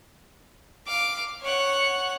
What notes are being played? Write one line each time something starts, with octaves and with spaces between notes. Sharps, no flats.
F5 D6
C#5 F#5